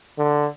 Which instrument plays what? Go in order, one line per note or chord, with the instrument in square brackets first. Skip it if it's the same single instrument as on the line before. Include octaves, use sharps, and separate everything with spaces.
[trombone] D3